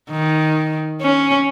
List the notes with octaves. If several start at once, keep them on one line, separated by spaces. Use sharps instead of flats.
D#3
C#4